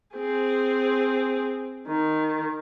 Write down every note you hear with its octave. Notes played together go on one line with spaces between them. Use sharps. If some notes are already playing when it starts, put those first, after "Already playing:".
C4 G#4
D#3